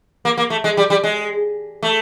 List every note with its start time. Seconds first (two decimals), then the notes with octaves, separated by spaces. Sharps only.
0.25 A#3
0.38 A#3
0.50 A3
0.64 G#3
0.77 G3
0.90 G3
1.04 G#3
1.83 A3